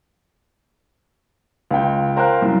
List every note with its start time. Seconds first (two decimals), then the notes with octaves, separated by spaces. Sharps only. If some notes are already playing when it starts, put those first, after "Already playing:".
1.71 C#2 G5
2.17 A#4 C5 F5 G5 F#6
2.42 C2 F#2